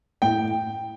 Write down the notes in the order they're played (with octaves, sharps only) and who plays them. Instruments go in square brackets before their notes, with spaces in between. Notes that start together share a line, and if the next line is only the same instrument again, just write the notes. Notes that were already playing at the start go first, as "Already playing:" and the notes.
[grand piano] A2 G5